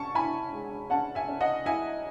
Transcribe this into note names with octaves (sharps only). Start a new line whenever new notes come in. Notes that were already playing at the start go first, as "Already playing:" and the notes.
Already playing: C#4 A5 C#6
E4 G#5 B5
G#3
C#4 F#5 A5
E5 G#5
C#4
D#5 F#5
E4 E5 G#5